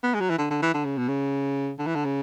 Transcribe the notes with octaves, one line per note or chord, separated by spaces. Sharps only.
B3
G#3
F#3
E3
D3
D3
E3
D3
C#3
B2
C#3
D3
E3
D3
C#3